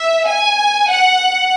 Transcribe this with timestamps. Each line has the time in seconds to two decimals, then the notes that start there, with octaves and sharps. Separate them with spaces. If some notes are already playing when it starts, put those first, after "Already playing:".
Already playing: E5
0.28 G#5
0.89 F#5